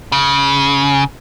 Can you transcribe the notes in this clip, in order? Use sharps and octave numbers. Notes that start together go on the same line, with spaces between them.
C#3